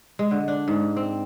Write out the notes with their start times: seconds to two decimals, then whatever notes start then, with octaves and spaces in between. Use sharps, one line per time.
0.19 G#3
0.31 D3
0.48 D4
0.68 G#2
0.97 C4